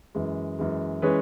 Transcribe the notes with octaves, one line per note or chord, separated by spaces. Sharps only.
F#2 E3 G#3
F#2 E3 G#3
E3 G#3 C#4 G#4 B4